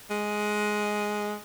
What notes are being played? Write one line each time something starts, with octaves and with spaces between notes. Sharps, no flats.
G#3